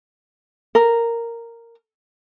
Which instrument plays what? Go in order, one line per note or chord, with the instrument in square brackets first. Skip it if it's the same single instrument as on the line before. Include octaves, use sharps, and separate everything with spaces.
[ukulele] A#4